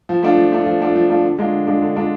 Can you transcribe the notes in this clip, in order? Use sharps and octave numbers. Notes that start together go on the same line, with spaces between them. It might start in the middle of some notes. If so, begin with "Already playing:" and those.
F3
A3 D4 F4
F3
A3 D4 F4
F3
A3 D4 F4
F3
A3 D4 F4
D3
G#3 D4 F4
D3
G#3 D4 F4
D3
G#3 D4 F4